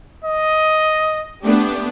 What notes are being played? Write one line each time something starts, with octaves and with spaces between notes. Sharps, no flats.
D#5
A3 B3 D4 G4